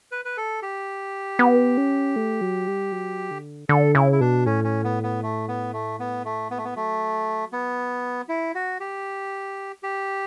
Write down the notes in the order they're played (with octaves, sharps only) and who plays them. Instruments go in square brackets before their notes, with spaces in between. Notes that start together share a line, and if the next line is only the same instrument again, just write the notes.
[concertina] B4
B4
A4
G4
[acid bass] B3
C#4
A3
F#3
G3
F#3
D3
[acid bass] D3 [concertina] A4
[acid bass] C#3 [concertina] E4
[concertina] E4
[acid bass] B2 [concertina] D4
[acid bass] A2 [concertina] C#4
[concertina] C#4
B3
B3
A3
B3
A3
B3
A3
B3
A3
B3
[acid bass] F#3 [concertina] A3
[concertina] B3
E4
F#4
G4
[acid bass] A3
[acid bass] G3 [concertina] G4
[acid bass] F#3